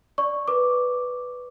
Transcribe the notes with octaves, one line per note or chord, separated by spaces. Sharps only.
D5 C#6
B4 D6